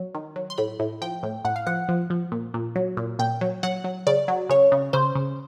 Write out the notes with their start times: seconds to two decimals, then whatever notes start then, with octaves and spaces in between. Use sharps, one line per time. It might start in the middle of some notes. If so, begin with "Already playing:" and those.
Already playing: F#3
0.15 D#3
0.36 F#3
0.50 C6
0.58 A2 B5
0.79 A2
1.02 F3 G5
1.23 A2
1.45 A2 F#5
1.56 F5
1.67 F3 F#5
1.89 F3
2.10 F3
2.32 A#2
2.54 A#2
2.75 F#3
2.97 A#2
3.19 A#2 G5
3.41 F#3
3.63 F#3 F#5
3.84 F#3
4.07 C#3 D5
4.28 F#3
4.49 C#3 C#5
4.72 C#3
4.93 C#3 C5
5.15 C#3